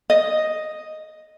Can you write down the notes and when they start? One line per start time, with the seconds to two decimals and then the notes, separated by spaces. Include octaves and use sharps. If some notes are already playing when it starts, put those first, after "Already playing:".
0.10 D#5